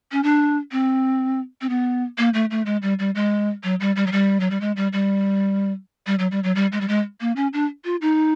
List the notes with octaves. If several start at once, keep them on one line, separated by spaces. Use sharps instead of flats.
C#4
D4
C4
C4
B3
A#3
A3
A3
G#3
G3
G3
G#3
F#3
G3
G3
F#3
G3
F#3
G3
G#3
G3
G3
G3
F#3
G3
F#3
G3
G#3
G3
G#3
A#3
C#4
D4
F4
D#4